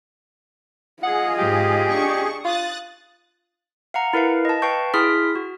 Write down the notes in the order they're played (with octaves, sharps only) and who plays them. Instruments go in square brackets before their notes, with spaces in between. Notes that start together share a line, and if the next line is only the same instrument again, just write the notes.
[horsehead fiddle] F4 D#5 [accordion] G#4 [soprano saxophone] F#5
[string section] G#2 [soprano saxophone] G4
[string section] D4 C#6
[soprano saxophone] F4 [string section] D#6 F#6 A6
[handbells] F5 F#5 A#5
E4 A#4 B4 F5
D#5 A5
B4 F5 G5 A5 C#6 G6
E4 G#4 C6 D#6 F6 B6
F#4